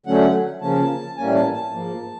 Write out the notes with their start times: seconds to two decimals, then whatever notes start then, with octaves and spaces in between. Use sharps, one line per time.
0.06 D3 F#3 A3 C#4 F#5
0.61 C#3 F3 A#3 C#4 A5
1.17 A2 E3 G3 A#3 C#4 G#5
1.35 A5
1.54 A5
1.73 G#2 F3 A#3